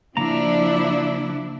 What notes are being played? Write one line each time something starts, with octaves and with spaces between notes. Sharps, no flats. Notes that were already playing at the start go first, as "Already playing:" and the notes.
C#3 F3 A#3 D4 E4 A#5